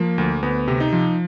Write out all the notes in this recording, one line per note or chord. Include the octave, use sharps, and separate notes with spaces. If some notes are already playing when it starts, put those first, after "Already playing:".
Already playing: F3 A#3
D2
D2 B3
C3
D#4
F3